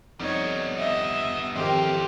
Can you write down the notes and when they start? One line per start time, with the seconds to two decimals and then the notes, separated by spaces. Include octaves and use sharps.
0.20 F2 G3 B3 D#4 C#5
0.79 D#5 E5
1.56 G#1 F2 E3 F4 G4 A#4 C5